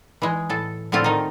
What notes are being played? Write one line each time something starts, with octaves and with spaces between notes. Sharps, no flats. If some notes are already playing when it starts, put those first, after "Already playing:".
E3 G#3
A2 A4
A2 D3 A3 C4 F4
D#3 D#4